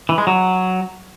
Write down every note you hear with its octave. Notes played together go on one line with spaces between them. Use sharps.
E3
G#3
F#3